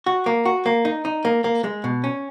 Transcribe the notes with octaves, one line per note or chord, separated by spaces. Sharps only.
F#4
A#3
F#4
A#3
D#4
D#4
A#3
A#3
G#3
B2
C#4